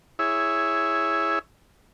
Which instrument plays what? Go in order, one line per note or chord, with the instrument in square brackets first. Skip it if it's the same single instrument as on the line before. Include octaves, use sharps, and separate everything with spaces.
[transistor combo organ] E4 G#4 C#5 E5